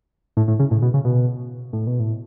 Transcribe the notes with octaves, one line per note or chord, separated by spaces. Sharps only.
A2
A2
C#3
A2
B2
C#3
B2
A2
B2
A2